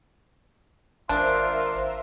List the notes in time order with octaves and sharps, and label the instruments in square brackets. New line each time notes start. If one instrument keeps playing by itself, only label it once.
[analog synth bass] G#1 [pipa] D4 [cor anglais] F4 [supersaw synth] A#4 C5 E5